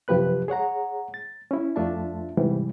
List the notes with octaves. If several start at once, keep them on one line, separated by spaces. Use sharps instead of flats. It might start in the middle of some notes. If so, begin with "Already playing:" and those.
F#2 C3 F3 G4 B4 F#6
G#4 C#5 F#5 A#5
A6
C#4 E4
F2 A3 D4 F4 E5 A5
G#2 C3 E3 G3